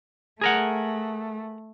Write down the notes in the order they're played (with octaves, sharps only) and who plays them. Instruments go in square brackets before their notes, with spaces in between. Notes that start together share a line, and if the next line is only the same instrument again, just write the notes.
[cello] A3 [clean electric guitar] G#4 A#4 F#5